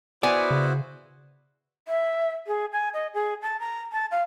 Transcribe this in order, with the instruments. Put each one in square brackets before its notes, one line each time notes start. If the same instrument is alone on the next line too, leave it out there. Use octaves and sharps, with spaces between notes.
[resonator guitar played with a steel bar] B3 G#5 [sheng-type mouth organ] E4 F#4 C5 [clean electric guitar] D5
[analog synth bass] C#3
[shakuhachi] E5
G#4
G#5
D#5
G#4
A5
A#5
A5
F5